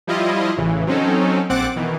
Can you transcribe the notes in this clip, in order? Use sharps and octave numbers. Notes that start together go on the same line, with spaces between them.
F3 G3 E4 F4 D#5
A1 C#3 E3
F#3 C4 C#4 D#4 A4
A#1 C4 F#5 D6 F#6 A6
B2 D#3 E3